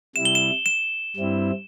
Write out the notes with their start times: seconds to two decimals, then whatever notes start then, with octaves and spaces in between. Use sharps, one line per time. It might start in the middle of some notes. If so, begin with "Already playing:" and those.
0.16 C3 G3 E4 E7
0.25 G7
0.35 E7
0.66 E7
1.16 G2 G3 C4 E4